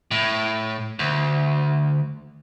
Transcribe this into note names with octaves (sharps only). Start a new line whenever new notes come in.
A2
D2